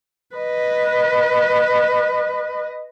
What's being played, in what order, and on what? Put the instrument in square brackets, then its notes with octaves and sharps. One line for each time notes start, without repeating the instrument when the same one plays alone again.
[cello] B4 D#5